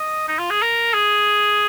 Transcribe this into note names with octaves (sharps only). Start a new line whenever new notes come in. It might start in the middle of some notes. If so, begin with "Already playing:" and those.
Already playing: D#5
D#4
F4
G#4
A#4
G#4